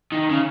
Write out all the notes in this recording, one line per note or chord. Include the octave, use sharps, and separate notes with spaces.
D#3
C#3